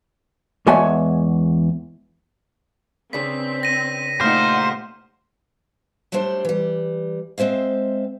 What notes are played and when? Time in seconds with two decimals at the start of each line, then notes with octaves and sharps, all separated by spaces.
0.67 E2 G#3 B3 C#5 G#5 A5
3.13 C#3 C4 D4 B4 B6
3.63 A#6 D#7
4.21 A#2 A3 D#4 G4 C5 F#5 F6
6.12 F#3 G3 A3 D4 C5
6.45 E3 G3
7.38 G#3 C4 C5 E5 F5